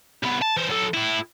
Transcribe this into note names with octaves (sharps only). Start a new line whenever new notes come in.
C2 B3
A5
E3 C5
F#3 A4
A2 E4